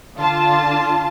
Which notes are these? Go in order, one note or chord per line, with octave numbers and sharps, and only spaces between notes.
D3 F4 A5